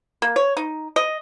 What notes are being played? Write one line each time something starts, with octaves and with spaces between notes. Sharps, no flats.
A#3
C#5
D#4
D#5